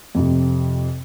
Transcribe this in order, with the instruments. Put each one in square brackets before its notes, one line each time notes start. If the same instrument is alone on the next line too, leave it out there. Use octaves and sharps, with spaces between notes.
[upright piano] F2 C3